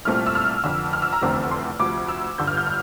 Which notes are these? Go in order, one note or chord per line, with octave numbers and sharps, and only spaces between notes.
C2 A#2 A3 C4 F6
E6
F6
F1 F2 D3 E6
F6
E6
A#5
F1 E2 D3 A3 C4
C6
D2 C3 F3 D6
E6
G1 G2 D3 G6
F6
G6
F6